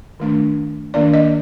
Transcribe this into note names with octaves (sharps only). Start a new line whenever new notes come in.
D#3 A3 D4
D#3 A#3 D4 D5
D#5